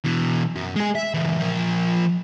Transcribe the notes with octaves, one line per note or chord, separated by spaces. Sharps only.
B2 E3
F#2
G#3 G#4
E5
C#2 E3
F3 A#4